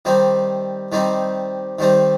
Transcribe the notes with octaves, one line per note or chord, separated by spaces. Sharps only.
D#3 G3 C4 D#4
D#3 G3 C4 D#4
D#3 G3 C4 D#4